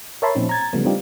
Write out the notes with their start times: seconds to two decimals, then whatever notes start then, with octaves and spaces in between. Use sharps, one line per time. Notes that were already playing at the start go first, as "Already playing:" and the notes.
0.22 A#4 C#5 E5 A5 B5 C6
0.35 A#2 F3 C4 C#4 D#4
0.49 A#5 G#6 A6
0.73 C#3 F3 G3 A3 B3
0.84 G3 C4 D4 D#4 F4 G4